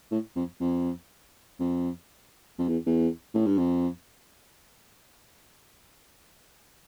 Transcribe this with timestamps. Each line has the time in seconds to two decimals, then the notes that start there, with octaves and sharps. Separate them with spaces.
0.11 A2
0.36 F2
0.60 F2
1.60 F2
2.59 F2
2.68 E2
2.86 E2
3.34 A2
3.46 G2
3.58 F2